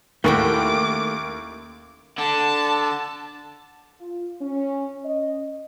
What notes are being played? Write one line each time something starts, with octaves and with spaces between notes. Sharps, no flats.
D#2 A3 C#4 E4 F#4 G4 D6
D3 A5
F4
C#4
D#5